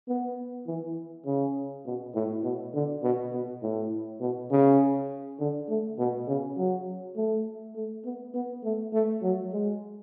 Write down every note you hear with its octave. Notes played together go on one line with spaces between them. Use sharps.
B3
E3
C#3
B2
A2
B2
D3
B2
B2
A2
B2
C#3
D3
A3
B2
C#3
F#3
A3
A3
B3
B3
A3
A3
F#3
G#3